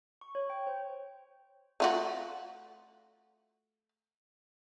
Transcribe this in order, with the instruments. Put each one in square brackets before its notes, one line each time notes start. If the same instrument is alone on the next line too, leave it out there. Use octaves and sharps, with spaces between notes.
[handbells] C#6
C#5
G5
C5
[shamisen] A3 F4 F#4